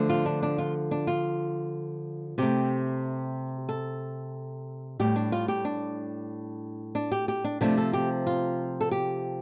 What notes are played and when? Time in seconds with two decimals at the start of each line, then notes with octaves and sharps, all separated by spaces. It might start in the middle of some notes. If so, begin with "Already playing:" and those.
Already playing: D3 F3 A3
0.09 F4
0.26 D4
0.43 D4
0.58 F4
0.91 D4
1.07 F4
2.38 C3 A3 G4
3.69 A4
4.99 A2 G3 G4
5.16 D4
5.32 F4
5.48 G4
5.65 D4
6.95 D4
7.12 G4
7.28 G4
7.44 D4
7.61 C3 F3 A3 D4
7.78 A4
7.93 G4
8.27 F4
8.81 A4
8.91 G4